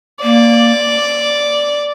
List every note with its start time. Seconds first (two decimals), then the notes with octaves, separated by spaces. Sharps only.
0.22 A#3 D5